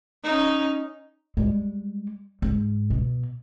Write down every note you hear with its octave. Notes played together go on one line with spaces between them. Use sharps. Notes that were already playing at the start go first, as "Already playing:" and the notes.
C#4 D#4
G3 G#3
G#2
B2